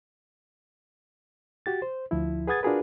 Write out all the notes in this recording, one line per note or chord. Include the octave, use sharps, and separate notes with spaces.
F#4 G4 A6
C5
D2 F3 E4
G#4 B4 F#5 D#6 G#6 A6
D4 F4 F#4 G#4 A#4 B4